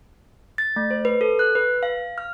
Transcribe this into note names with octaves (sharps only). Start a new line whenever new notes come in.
A6
A3
C5
B4
A4
F#6
B4
F5
F6